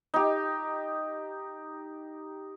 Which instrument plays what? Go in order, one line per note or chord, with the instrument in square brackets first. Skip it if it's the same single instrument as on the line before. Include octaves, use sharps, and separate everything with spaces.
[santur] D#4 G4